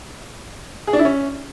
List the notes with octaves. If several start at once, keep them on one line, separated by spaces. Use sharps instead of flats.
G#4
D4
E4
C#4